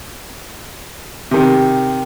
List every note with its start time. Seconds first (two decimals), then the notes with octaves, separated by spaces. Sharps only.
1.31 C3 D#3